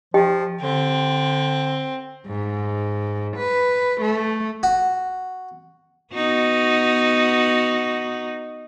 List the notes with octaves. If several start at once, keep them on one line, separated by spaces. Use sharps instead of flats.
F3 G4 D#5 G5
D3 C4
G#2
B4
A3
F#4
B3 D#4 F#4